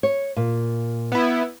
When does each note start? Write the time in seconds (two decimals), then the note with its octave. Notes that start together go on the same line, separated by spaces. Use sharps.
0.03 C#5
0.36 A#2
1.12 B3 E4